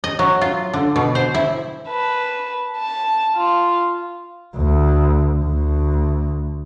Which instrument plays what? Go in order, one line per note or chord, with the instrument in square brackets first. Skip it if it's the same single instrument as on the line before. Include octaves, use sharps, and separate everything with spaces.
[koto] D#5
F#3
F4
D3
B2
C5
E4
[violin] B4 A5
A5
F4
[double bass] D2
D2